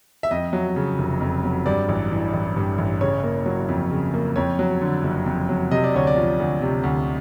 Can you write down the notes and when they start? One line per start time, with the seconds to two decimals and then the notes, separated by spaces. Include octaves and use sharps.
0.23 E5
0.31 F2 D#5
0.53 F#3
0.76 C#3
0.98 F1
1.21 F2
1.43 F#3
1.66 G2 D5
1.89 A1
2.11 E3
2.33 A1
2.56 G2
2.78 A1
3.01 C#3 C#5
3.23 A#3
3.46 F#3
3.69 F2
3.91 C#3
4.14 A#3
4.36 F2 C#5
4.59 F#3
4.81 D3
5.03 F#1
5.26 F2
5.49 F#3
5.71 C3 D#5
5.84 D5
5.94 D2 C#5
6.07 D5
6.16 F3
6.40 D2
6.62 C3
6.83 D2